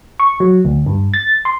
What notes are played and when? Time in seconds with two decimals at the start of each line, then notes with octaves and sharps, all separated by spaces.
0.20 C#6
0.40 F#3
0.65 D2
0.86 G2
1.14 A6
1.45 C6